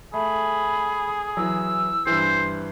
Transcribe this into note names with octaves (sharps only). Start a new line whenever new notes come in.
A3 G#4 B5
E3 F#3 E6
G2 E3 C5